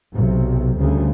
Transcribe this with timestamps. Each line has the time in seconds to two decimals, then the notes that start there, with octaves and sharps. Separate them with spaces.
0.14 B1 C3
0.77 D2 C#3 G3